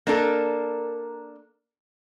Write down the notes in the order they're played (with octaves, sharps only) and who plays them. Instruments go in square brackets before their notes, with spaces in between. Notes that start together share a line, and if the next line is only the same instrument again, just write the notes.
[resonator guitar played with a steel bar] A#3 D4 A4 A#4